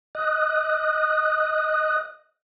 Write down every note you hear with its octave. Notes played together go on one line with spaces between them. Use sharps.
D#5 D#6 F#6